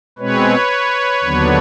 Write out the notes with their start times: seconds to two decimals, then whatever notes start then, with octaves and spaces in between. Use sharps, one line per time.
0.18 B2 G#3 C4 B4 C#5
1.24 D#2 D3 F#3 B3 D4